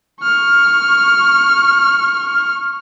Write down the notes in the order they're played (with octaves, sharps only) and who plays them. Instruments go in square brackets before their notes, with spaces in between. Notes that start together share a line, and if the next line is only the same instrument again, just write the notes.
[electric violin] C#6 F6